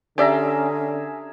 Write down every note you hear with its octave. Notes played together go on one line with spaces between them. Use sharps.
D3 C#4 G4 G#4 D5 E5 A#5